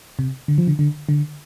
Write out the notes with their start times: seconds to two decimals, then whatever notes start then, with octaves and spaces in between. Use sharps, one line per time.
0.19 C3
0.48 D3
0.58 F3
0.67 D3
0.79 D3
1.09 D3